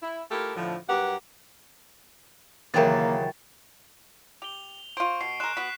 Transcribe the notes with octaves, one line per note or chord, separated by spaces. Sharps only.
E4
A3 E4 F4 G4 A4 A#4
A2 D3 F3
G2 F#3 G4 A#4 B4 F#5
D#2 C#3 E3 F#3 A#3 A#4 G5 A6
G4 F7 G7
F4 C5 C#6 D7
B2 C7
G#3 A#4 F#6 E7
B3 F#4 B6